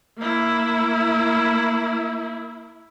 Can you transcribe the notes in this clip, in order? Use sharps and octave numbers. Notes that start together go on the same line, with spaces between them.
A#3 E4